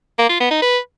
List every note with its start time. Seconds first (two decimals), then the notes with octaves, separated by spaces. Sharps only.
0.18 A#3
0.29 F4
0.40 B3
0.51 D#4
0.62 B4